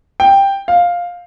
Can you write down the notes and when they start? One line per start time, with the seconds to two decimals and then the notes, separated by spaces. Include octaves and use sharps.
0.20 G5
0.68 F5